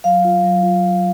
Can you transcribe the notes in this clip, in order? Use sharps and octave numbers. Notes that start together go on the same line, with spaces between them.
F#3 F5
F4
F#3
F4